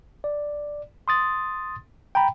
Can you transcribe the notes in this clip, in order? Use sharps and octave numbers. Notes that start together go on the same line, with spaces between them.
D5
C6 D#6 A6
G5 A#5 B5